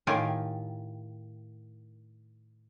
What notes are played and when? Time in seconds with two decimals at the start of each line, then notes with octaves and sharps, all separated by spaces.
0.07 A2 D#3 F4 G4 A#4 G#5